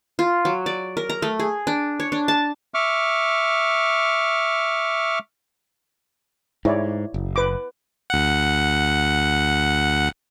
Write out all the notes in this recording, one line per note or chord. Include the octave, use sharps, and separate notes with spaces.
F4
F#3
D5
A#4
A#5
A3
G#4
D4
C#5
D4
A5
E5 C#6 D6 F6
G#2 E4 C#5 D5
F#1
B4 D6
D2 F#5